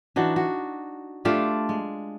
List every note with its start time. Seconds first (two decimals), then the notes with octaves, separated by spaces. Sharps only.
0.16 E3 D4 D#4 F#4
0.36 F#4
1.25 A3 D4 F4 G4
1.69 G#3